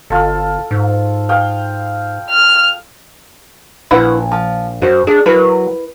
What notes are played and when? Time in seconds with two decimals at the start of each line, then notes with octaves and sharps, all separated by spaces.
0.10 G1 F4 A4
0.71 G#2
1.29 F5 G5 D#6
2.30 F6
3.91 A#1 E4 B4 F#5
4.32 F3
4.82 F#2 F#4 C5
5.07 D4 G#4
5.26 F#3 E4 A#4 B4